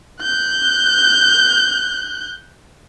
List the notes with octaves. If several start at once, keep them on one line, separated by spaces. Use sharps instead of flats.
F#6 G6